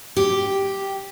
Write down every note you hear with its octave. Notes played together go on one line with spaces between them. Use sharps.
G4